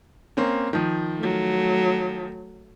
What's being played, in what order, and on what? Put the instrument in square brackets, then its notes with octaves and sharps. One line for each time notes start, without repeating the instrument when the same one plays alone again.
[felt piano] A#3 C4 C#4
D#3 F3
[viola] F#3 A3